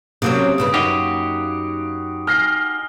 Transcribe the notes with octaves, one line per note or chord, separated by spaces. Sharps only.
C3 F#3 A#3 C#4 D#6 D7
G2 C#3 B4 B5 D#6
F#2 D#4 F#4 G4 C7 F7
G#5 F6 A#6 C7 G7